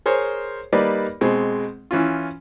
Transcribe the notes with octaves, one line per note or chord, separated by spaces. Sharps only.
G#4 A#4 C5 C#5
G3 A#3 D#4 B4 D5
B2 G#3 C4
E3 C#4 F4